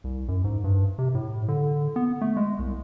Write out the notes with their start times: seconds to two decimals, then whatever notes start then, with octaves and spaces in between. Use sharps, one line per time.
0.04 C2
0.28 F#2
0.44 G#2
0.64 G2
0.98 C3
1.15 A2
1.48 D3
1.96 B3
2.21 A3
2.37 G#3
2.59 C2